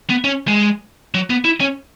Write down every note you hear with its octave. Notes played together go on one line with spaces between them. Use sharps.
B3
C#4
G#3
F#3
B3
E4
C#4